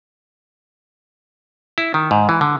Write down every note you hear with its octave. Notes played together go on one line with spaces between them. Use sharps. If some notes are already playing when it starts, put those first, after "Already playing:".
E4
D#3
G#2
E3
D3